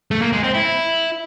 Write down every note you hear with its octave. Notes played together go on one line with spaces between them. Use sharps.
A3
A#3
G#3
C4
E4